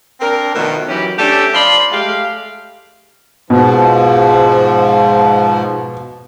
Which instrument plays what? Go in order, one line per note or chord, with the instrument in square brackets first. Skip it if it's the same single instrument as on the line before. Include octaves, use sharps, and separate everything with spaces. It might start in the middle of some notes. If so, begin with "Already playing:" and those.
[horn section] C4 D4 A#4
B2 D#3 F3 A3
D#3 E3 F#3 C#4 G4
A3 C#4 D4 G4 A4
F3 D5 B5 C6
G#3 A3 G4 F5
[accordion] G#2 F3 [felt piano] B2